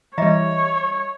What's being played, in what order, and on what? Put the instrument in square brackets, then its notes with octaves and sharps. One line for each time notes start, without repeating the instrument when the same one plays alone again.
[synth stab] E3 G3 [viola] C#5 [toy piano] D#5 E5 A#5